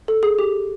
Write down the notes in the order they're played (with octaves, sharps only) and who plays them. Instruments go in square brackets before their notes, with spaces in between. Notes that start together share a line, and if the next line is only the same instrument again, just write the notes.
[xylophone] A4
G#4
G4